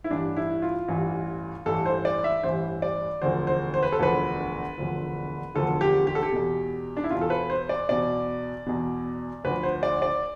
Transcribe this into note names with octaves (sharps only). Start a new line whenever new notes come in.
E4
A1 G2 E3 D4
E4
F4
A1 G2 E3
A1 G2 E3 A4
C5
D5
E5
A1 G2 E3 C5
D5
E1 D2 D3 F3 C5
C5
C5
B4
A4
E1 D2 D3 F3 B4
E1 D2 D3 F3
E1 D2 D3 F3 A4
G4
G4
A4
G4
E2 B2
D4
E4
E2 B2 F4
A4
B4
C5
D5
E2 B2 D5
E2 B2
D2 D3 F3 B4
C5
D5
D5